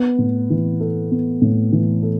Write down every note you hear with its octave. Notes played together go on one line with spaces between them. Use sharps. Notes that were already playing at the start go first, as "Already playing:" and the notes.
Already playing: B3
A2
E3
A4
B3
A2
E3
A4